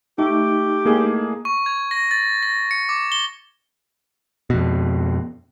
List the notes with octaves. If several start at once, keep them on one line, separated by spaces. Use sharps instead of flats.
A3 D#4 G4
A2 G#3 A#3 G#4 D6
C#6
G#6
A#6
A6
A#6
C#7
D6
G7
F2 B2